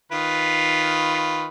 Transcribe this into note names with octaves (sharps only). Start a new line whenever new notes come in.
D#3 F4 B4